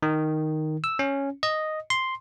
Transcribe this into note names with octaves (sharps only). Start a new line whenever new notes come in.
D#3
E6
C#4
D#5
C6